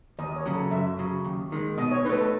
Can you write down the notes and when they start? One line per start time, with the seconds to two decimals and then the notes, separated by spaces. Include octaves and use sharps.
0.19 D#2 D#5
0.36 C#5
0.46 C#3 F#3
0.54 A4
0.71 F#2 E5
0.99 C#3 F#3
1.24 D#2
1.52 D#3 G#3
1.78 B2 D#5
1.91 C#5
2.05 A3 D#4 B4
2.18 A4